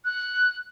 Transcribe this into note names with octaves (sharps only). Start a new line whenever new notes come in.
F#6